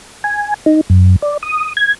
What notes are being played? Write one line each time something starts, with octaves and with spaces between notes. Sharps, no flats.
G#5
D#4
F#2
D5
D#6
G#6